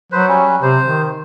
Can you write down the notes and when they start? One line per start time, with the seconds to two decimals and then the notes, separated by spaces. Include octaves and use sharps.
0.12 F#3 B4 C5
0.28 G3 C#4
0.62 C3 C5
0.84 D#3